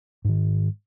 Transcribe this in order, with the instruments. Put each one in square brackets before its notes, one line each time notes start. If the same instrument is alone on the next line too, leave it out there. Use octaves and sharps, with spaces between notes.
[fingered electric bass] G#2 D#3